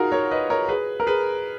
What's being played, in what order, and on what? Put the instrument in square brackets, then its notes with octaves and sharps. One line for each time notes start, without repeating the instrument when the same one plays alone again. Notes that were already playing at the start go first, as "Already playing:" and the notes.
Already playing: [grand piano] D#4 F4 F#4 G#4 A#4
A#4 C#5
B4 D#5
A#4 C#5
G#4 B4
A#4
G#4 B4